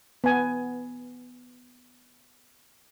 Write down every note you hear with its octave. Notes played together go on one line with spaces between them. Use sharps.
B3 G#5